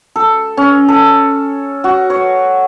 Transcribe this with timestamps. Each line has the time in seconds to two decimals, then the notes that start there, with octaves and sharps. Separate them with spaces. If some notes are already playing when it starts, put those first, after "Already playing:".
0.16 A4
0.57 C#4
0.88 A4
1.84 F#4
2.10 C#5